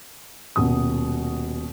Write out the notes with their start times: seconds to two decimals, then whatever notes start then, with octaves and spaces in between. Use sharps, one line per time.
0.56 D#1 B2 D#6